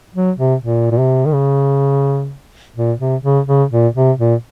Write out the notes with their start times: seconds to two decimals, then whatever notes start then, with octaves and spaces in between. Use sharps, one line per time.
0.15 F#3
0.38 C3
0.62 A#2
0.91 A#2
0.98 C3
1.26 D#3
1.33 C#3
2.76 A#2
2.99 C3
3.23 C#3
3.47 C#3
3.71 A#2
3.95 C3
4.18 A#2